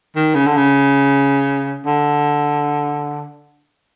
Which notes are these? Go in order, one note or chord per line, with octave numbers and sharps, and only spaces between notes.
D#3
C#3
D3
C#3
D3